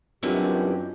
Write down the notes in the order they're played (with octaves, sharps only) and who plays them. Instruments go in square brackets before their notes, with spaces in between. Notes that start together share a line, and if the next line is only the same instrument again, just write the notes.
[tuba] F#2 [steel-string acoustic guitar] E3 G3 G#3 [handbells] C4 D4 F4 [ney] G4